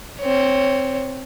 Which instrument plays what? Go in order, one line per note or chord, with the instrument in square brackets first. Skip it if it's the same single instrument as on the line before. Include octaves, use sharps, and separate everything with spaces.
[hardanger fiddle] C4 C#5